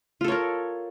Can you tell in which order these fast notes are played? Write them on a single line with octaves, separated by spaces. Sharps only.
F4 A4 C#5 A#4